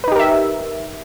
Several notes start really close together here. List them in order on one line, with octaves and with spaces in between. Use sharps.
B4 D#4 G4 A#4 E5